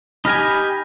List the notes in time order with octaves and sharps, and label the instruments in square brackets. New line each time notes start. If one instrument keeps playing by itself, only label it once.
[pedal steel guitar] D#4 G4 G#5 [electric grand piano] B5 F6 A#6